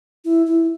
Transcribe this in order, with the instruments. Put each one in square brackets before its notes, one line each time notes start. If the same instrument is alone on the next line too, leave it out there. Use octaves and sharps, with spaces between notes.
[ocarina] E4
E4